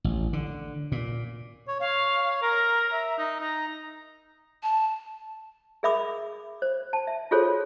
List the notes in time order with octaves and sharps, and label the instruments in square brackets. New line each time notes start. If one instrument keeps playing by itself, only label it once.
[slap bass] A1
D3
A#2
[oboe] C#5
[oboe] C#5 [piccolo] F5
[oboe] A#4 [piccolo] A#5
[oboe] E5
D#4
[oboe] D#4 [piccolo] A#5
[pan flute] A5
[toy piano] G#4 A#4 E5 B5 D6 D#6
C5
A5
E5
F4 F#4 G#4 A4 C5 C#5